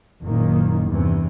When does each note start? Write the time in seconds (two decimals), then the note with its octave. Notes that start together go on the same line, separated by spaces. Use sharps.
0.23 F#1 A#2 D#3 A#3
0.88 E2 G2 C3 E3